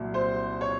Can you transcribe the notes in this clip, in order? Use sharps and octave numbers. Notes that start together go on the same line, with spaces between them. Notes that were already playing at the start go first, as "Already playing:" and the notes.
Already playing: C2 A#2 F#3
C5
C#5